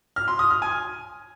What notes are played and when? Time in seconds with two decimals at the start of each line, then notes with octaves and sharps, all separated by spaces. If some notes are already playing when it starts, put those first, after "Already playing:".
0.16 F6
0.28 C6
0.39 D#6
0.51 F6
0.62 G#5